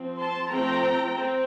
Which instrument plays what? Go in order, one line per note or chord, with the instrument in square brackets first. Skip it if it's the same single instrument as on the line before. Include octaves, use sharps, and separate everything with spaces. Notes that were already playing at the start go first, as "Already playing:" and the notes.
Already playing: [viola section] F3 C4
A5 C6
F3 A3 C4 G5 A#5
C4